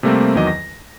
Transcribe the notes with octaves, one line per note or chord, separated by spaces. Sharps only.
C3 G3 A3 A#3 C4
E2 D#3 F#3 D#5 D6
A#6